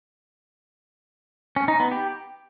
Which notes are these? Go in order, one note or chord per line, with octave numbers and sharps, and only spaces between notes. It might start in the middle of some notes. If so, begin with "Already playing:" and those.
C#4
D#4
B3
G4